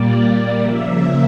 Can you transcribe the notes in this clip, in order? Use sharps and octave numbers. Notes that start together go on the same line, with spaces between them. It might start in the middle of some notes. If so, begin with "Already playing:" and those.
Already playing: A#2 G3 A#3 D5
D5
C#3 F3 A#3 E5